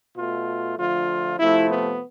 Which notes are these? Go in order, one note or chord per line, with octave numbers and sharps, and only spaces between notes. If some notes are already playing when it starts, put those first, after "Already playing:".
B2 A3 F4
D3 F3 A3 F4
C3 F3 A3 E4
B3